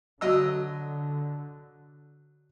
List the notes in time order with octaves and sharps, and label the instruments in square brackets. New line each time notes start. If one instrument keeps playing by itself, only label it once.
[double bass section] D3 [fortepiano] F#3 D#5 E6